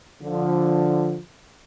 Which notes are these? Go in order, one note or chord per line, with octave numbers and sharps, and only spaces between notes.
D3 F3